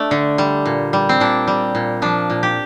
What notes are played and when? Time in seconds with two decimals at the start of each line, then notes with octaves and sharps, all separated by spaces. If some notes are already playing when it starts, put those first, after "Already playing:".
Already playing: A3 D4
0.11 D3
0.38 G3
0.66 A#2
0.93 G3
1.09 C4
1.20 A#2 D4
1.47 G3
1.75 A#2
2.02 F3 D4
2.30 A#2
2.43 G4